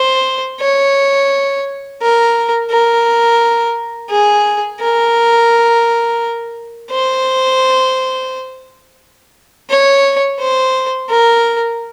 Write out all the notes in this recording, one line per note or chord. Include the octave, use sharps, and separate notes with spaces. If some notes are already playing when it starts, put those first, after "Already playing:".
Already playing: C5
C#5
A#4
A#4
G#4
A#4
C5
C#5
C5
A#4